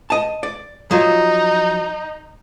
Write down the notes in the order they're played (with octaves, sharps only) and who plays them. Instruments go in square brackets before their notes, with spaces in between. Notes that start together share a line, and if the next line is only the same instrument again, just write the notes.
[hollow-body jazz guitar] D#5 A5
D5
[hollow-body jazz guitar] F3 F#3 [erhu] D#4